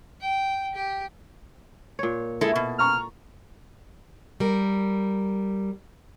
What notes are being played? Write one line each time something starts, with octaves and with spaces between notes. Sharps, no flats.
G5
G4 G5
A#2 C#5
G#3 E4 A4
B2
A#5 C#6 F6
G3 A#4